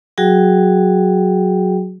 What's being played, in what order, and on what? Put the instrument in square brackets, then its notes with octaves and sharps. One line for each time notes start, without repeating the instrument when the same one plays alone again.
[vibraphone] F#3 F#4 G#4 G5